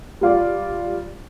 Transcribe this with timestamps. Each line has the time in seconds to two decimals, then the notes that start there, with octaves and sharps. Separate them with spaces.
0.21 G3 F4 D5